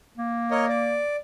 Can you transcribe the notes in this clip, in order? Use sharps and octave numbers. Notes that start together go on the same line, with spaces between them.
A#3
A#4 C#5 D#5
D5